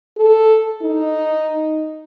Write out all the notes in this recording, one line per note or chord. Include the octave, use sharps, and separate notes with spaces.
A4
D#4